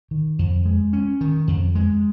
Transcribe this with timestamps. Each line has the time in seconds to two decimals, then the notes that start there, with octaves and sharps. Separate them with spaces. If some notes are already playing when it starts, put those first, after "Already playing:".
0.11 D#3
0.39 F2
0.65 G#3
0.93 C#4
1.21 D#3
1.48 F2
1.75 G#3